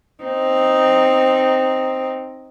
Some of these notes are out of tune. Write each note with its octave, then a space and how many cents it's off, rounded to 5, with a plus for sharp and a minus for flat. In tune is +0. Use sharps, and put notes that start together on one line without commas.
C4 +0 D#4 +0